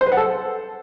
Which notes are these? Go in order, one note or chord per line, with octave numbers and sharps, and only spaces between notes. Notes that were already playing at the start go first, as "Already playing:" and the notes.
C5
B4
F#5
A4